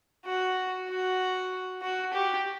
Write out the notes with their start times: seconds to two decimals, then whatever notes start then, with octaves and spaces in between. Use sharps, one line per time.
0.25 F#4
0.89 F#4
1.82 F#4
2.13 G4